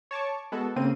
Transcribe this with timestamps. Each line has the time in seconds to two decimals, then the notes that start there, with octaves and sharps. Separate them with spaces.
0.11 C#5 A5 C#6 D6
0.52 G#3 B3 F#4 A4
0.76 C#3 A#3 C4 D#7